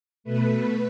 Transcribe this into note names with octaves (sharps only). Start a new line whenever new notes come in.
B2 A3 B4